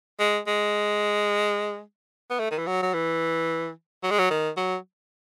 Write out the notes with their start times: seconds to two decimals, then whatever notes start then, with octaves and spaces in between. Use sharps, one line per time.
0.20 G#3
0.47 G#3
2.30 B3
2.39 A3
2.51 D#3
2.58 E3
2.67 F#3
2.82 F#3
2.94 E3
4.03 F#3
4.11 G#3
4.19 F#3
4.30 D#3
4.57 F#3